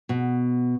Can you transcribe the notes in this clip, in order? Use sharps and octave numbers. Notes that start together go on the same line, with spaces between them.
B2